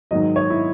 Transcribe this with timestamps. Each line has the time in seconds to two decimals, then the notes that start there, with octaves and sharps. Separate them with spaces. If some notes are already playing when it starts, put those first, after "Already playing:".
0.11 G#2 D#3 F#3 D#5
0.36 C#5
0.50 E4